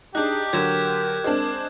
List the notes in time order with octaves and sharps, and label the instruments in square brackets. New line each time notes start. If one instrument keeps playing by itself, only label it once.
[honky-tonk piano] D4 D#4 [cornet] G4 [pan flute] G#4 [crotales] F#6 G6
[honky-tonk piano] D3 F#3 [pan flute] A#4 [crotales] G#6 E7
[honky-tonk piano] G#3 C4 D4 [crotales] D6